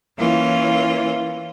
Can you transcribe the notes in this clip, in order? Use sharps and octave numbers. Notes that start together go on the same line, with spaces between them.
E3 A#3 C#4 F4